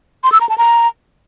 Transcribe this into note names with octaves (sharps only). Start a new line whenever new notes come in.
C6
E6
A#5
A5
A#5